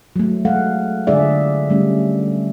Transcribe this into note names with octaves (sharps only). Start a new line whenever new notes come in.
F#3 A3
G#3 A4 F5 F#5
D3 G#3 F4 G#4 D5 E5
G3 A3 C#4